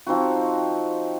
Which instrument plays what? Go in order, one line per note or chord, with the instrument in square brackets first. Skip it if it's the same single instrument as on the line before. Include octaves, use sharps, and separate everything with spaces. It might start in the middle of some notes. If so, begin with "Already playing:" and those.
[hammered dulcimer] F3 C4 D#4 F#4